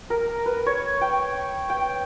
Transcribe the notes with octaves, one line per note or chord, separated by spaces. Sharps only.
A#4
B4
C#5
G5
G5